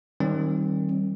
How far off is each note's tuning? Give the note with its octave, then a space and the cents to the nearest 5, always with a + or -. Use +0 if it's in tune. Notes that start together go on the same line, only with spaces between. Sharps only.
D#3 +0 G3 -25 C4 +35